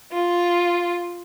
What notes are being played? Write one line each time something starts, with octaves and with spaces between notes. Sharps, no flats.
F4